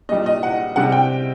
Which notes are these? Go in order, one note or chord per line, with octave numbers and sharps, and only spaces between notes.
A#2 G3 D#5
D#5
F#5
C3 G3 F#5
G5